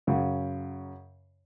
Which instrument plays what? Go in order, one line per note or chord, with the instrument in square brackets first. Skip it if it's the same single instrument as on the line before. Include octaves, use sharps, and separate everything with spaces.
[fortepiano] F#2 C#3